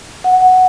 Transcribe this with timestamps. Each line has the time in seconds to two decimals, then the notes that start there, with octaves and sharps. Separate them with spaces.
0.24 F#5